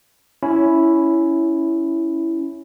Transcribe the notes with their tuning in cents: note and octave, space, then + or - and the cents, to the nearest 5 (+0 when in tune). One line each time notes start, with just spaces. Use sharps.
C#4 +10 E4 +0